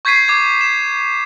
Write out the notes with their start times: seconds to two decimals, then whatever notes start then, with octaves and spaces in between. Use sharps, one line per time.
0.05 C#6 G6 G#6 B6 C7 D#7
0.28 D6 G#6 C7
0.61 E7